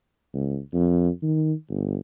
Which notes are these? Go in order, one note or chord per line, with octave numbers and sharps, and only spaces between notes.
C#2
F2
D#3
G1